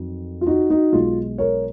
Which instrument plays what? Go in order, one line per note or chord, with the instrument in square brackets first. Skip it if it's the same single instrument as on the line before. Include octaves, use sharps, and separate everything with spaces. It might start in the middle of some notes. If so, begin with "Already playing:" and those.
Already playing: [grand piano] F2 D#3 F#3
F4
D#4 F#4
D#4 F#4
B1 B2 G#3 F4
A#4 C#5